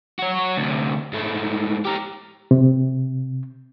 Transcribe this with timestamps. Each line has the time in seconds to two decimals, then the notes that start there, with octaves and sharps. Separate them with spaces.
0.19 F#4 C#5
0.57 D2 C3
1.13 G#2 A3
1.85 G4 A#4
2.51 C3